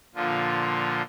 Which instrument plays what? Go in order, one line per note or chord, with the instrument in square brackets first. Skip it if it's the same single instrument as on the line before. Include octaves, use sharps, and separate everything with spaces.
[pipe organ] A#2 D3 F3 F4